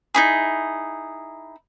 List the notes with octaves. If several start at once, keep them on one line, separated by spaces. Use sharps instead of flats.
D#4 E4 G#4